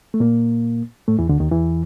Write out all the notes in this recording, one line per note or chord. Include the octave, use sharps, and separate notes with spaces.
A3
A#2 A#3
A2 A3
E2 E3
D2 D3
D#2 D#3
E2 E3